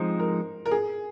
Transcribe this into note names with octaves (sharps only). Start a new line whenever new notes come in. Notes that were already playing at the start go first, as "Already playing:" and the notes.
Already playing: F3 G#3 C4 D#4 C5
A#4
A#4
G#4